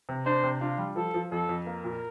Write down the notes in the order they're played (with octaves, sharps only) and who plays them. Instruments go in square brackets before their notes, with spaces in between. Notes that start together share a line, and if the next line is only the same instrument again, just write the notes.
[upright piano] C3
[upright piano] D4 [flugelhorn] C5
[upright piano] C3
[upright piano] D4 [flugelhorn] F4
[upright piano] G3
[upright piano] F3 [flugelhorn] A4
[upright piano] F3
[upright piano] F2 [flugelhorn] A4
[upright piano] F2
[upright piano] A#3 [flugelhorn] A#4
[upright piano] A#2